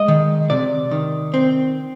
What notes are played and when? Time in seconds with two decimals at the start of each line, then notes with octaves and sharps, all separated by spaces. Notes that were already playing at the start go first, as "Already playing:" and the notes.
Already playing: G#3 D#5
0.08 D#3
0.50 C3 D5
0.91 D#3
1.34 C4